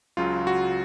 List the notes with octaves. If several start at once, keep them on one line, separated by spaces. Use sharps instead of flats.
C#2 C#3 F#3 F4
F#4